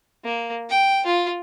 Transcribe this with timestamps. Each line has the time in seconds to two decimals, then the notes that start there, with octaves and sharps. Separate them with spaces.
0.24 A#3
0.70 G5
1.06 F4